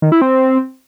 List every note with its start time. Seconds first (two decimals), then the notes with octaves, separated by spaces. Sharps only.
0.02 D#3
0.12 E4
0.22 C4